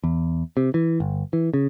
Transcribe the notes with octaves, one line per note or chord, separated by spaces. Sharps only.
E2
C3
E3
G1
E3
C#3